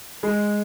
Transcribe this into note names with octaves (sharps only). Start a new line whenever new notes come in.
G#3